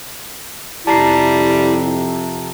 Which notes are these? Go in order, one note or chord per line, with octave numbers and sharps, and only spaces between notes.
F2 C3 G3 E4 A5 A#5 C7